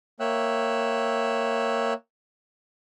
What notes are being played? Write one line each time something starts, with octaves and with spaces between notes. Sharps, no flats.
A#3 C#5 E5 G5 E6 F#6